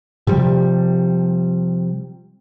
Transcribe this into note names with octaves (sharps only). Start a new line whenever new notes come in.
C3 F3 G3